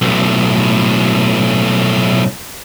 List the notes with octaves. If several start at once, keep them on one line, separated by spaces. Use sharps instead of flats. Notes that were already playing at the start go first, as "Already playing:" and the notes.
B1 A2